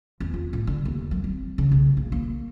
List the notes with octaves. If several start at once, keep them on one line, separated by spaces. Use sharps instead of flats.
E2
F4
A2
D3
D#2
F#3
C4
C#3
B1
A#1
A#3